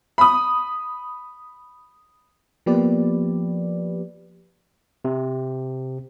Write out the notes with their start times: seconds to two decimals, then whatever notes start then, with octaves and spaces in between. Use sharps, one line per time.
0.18 B5 D#6
2.66 F3 A#3 B3 G4 B4 D5
5.05 C3